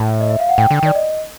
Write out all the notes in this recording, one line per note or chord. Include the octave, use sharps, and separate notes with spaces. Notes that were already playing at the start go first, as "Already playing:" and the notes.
Already playing: A2
D#5
E5
F5
F#5
A2 G5
D3
G5
D#3 D5
D#5